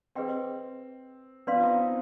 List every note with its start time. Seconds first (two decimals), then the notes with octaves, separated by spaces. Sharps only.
0.15 C4 G#4 B4 D#5 G5 C6
1.47 B3 D4 B4 D5 F5 C6
1.55 F4
1.63 C4 D#4
1.79 C4